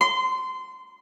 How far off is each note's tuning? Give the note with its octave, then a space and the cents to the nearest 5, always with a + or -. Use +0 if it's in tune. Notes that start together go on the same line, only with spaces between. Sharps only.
C6 -20